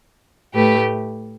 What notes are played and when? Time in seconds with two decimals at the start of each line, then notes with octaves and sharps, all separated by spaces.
0.54 A2 A3 G4 B4